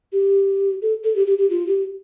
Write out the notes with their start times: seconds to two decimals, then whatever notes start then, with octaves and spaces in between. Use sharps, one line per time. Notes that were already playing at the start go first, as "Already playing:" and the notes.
0.12 G4
0.82 A4
1.04 A4
1.16 G4
1.27 G4
1.38 G4
1.50 F4
1.67 G4